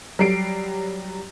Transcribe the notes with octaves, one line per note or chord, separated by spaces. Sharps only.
F#3 G3 C7 D7